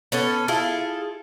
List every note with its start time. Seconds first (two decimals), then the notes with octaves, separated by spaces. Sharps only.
0.12 B3 C#4 A4
0.48 E4 F4 G#4 A4